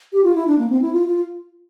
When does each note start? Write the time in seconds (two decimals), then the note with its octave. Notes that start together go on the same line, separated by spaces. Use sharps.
0.13 G4
0.24 F4
0.35 E4
0.47 D4
0.58 A#3
0.70 C4
0.82 E4
0.93 F4
1.08 F4